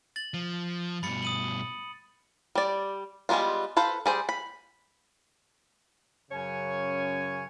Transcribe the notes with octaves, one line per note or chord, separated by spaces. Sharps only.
A6 F#7
F3
G2 B2 B5 A6 C#7
D#6 D#7 F#7
G3 D5
G3 G#3 A#3 B3 F4
A4 B4 C5 F5
G3 G#4 C5
B5
F#2 C#3 C#4 C#5 G#5